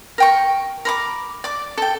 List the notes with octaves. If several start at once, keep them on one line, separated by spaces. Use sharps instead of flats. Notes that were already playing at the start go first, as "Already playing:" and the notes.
A#4 G5 C#6
A#4 B5 D6
D5 D6
A4 G5